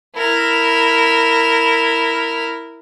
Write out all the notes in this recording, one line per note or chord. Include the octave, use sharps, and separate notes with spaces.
E4 A#4